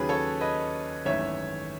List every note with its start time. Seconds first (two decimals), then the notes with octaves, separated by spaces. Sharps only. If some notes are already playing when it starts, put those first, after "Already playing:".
Already playing: D#2 C#3 F#3 G#4 B4
0.09 A4 C#5
0.41 B4 D#5
1.05 G#1 F#2 E3 A3 C#5 E5